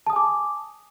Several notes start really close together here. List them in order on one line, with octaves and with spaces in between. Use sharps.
A5 D#6 G#5 D6